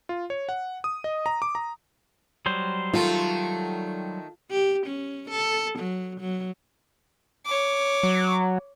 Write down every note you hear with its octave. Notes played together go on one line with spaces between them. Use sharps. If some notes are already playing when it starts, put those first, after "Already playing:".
F4
C#5
F#5
D#6
D#5
A#5
D6
A#5
F#3 G3 C5
D#3 A3 F4
G4
C#4
A4
F#3
F#3
C#5 D6
F#3